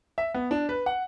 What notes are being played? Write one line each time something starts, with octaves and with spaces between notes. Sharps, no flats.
E5
B3
D4
B4
F#5